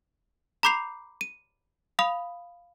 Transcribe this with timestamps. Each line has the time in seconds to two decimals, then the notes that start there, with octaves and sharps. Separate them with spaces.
0.63 A#5 B5 D6 G6 C7 F7
1.21 D#7
1.99 F5 B5 D#6 F7